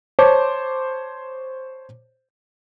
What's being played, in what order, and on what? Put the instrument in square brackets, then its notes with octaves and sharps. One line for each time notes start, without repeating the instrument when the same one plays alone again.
[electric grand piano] C5 C#5 A5 C6 D6